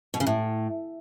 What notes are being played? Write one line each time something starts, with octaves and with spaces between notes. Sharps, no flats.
B2
C#3
A2